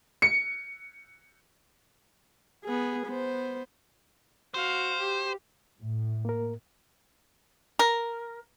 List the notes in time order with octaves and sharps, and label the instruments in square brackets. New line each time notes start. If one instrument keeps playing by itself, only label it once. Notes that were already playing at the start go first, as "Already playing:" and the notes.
[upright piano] C#7
[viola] B3 G#4
B3 C5
[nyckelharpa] F#4 F5 [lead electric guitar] C5
[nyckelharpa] G4
[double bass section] A2
[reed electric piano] A#3 A#4
[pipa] A#4